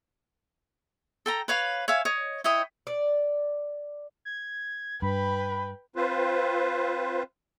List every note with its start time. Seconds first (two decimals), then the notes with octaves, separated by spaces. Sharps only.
1.26 A4 G5 A#5
1.48 B4 C#5 F5
1.88 C#5 E5 F5 G#5
2.05 C#5 D#5
2.44 E4 C#5 D#5 G5
2.87 D5
4.25 G#6
5.02 G2 B4 G5 B5
5.96 C4 F4 B4 C5